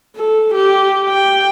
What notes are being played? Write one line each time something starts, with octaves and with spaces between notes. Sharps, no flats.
A4
G4
G5